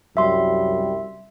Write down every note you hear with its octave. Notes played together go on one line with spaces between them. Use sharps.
C2 F#2 G3 E5 C6